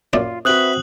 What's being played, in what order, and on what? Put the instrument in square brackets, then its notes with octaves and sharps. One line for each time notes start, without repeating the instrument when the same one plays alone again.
[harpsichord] F#2 A#2 D4 [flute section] F4
[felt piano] C4 F#4 [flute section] B4 E5 C#6 [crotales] D#6 F#6 F#7